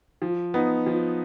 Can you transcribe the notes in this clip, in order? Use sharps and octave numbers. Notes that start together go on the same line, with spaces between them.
F3
B3 D#4
F3